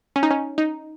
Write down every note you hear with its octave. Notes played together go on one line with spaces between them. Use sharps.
C#4
D#4
C#4
D#4